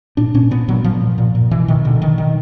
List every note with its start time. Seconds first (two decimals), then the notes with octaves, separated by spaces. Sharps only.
0.17 A#2 D4
0.34 A#2 C#4
0.51 A#2 B3
0.68 A#2 F#3
0.84 A#2 F3
1.01 A#2
1.18 A#2
1.35 A#2
1.51 B2 E3
1.68 B2 D#3
1.85 B2 D3
2.02 B2 D#3
2.18 B2 D#3